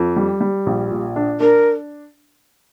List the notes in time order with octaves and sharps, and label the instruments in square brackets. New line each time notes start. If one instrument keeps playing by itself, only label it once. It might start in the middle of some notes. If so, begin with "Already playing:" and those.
Already playing: [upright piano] F2
G3
G3
A#1
A#2
D4
[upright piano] D4 [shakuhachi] A#4